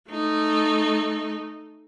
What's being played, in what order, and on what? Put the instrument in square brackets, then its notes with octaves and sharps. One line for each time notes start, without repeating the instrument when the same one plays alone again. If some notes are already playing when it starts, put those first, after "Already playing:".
[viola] A3 D#4